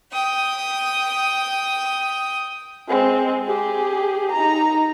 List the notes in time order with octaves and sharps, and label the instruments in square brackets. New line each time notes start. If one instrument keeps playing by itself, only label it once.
[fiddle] G5 D#6
[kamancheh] G#3 C4
G4 G#4
D#4 A#5